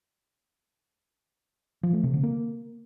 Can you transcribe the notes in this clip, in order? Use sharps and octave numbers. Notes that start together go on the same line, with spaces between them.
F3
A3
C3
D3
A#3